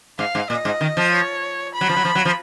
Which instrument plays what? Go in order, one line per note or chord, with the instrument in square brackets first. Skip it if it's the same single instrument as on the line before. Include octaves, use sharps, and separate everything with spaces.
[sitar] G#2 [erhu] F5
[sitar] G#2
[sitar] A#2 [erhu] D#5
[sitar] G#2
D#3
F3
[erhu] C#5
B5
[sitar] F#3
F3
F#3
F3
F#3
F3